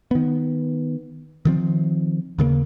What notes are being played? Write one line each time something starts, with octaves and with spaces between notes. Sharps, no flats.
D#3 B3
D#3 F3 C4
D#2 C#3 G#3 A#3